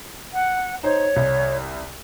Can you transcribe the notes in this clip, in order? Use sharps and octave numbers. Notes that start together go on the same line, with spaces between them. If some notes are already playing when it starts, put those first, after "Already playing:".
F#5
D#4 C5 C#5
C2